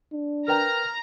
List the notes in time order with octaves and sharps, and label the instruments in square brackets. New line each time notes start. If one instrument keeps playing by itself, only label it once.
[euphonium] D4
[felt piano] A#4 B4 G5 [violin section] A#5 [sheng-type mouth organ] F6